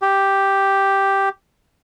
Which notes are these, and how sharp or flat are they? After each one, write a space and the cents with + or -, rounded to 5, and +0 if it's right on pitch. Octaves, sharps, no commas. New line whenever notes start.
G4 +0